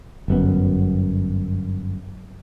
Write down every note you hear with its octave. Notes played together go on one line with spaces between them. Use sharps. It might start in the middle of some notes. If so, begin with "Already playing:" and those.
G1 F#2 B3